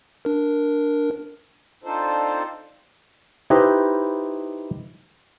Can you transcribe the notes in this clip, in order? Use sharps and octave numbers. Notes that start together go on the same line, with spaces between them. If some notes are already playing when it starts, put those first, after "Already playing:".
D4 A#4
C4 D4 D#4 F4 A4 C5
D#4 E4 G4 B4 C5 D#5